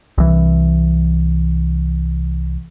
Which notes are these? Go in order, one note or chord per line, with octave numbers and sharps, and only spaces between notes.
C2 E3